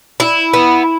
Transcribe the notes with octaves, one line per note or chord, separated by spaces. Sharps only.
E4
B3